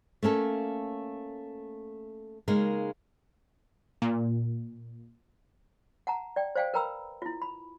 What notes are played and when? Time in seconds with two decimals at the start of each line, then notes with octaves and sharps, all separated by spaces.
0.23 A3 A#3 C#4 A4
2.48 C#3 G#3 A#3 D#4 A#4
4.02 A#2
6.07 F#5 A5 A#5
6.36 D5 G5
6.55 C5 D5 F5 G5 G#5
6.74 A#4 B4 G5 A#5 B5 E6
7.22 E4 F4
7.42 B5